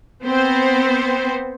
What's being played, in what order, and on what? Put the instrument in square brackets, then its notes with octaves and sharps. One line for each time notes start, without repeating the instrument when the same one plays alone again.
[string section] B3 C4 C5